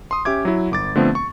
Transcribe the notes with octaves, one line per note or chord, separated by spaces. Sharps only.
C6 D#6
C#4 G4 E5 D6 G#6
F#3 E4
G1 D6 A6
D3 F3 A3 B3 C4
C#6